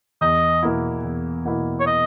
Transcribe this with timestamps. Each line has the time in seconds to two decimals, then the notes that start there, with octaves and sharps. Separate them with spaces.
0.21 E2 D#5
0.63 B2 A#3 E4
1.04 E2
1.45 B2 A#3 E4
1.80 C#5
1.87 D#5